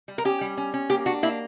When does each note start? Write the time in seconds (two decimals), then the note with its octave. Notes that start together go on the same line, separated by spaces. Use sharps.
0.08 G3
0.18 A#4
0.25 C#4 G4
0.41 G3
0.57 C#4
0.74 C#4
0.89 A#3 G4
1.06 D4 F#4
1.23 A#3 E4